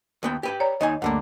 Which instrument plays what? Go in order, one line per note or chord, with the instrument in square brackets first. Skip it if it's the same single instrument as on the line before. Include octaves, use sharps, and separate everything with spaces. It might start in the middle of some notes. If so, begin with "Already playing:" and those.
[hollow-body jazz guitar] D#2 B3 G5
G4 B4 G5
[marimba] C#5 D5 A#5
[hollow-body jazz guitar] D#2 D#4 G#5 [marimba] D#5
[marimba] D2 A3 [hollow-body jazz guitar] G2 D3 A#3